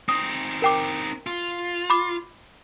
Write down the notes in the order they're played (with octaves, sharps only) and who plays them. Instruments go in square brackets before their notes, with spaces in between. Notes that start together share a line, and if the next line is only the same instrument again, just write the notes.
[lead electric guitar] C4 D#4 [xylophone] D#6
[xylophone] A#4 G5 D6
[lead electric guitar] F4
[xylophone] B5 D6